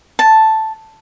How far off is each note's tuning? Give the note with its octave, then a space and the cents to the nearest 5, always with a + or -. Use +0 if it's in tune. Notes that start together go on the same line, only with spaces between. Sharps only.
A5 +0